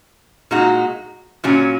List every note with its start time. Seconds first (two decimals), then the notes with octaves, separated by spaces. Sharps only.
0.51 A#2 G#3 D#4 F#4
1.44 A#2 F#3 C#4